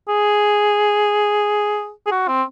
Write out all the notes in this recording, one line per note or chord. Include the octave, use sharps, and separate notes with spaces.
G#4
G#4
F#4
C4